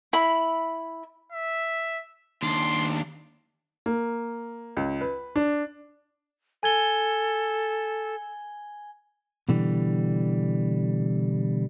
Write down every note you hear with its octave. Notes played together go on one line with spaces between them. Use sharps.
E4 B5
E5
D#2 D4 C6
A#3
C#2
B4
D4
A4 G#5 G#6 G7
B2 D3 E3 G3